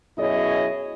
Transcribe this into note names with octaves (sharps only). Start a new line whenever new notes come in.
F#2 B2 E4 G#4 C#5 D#5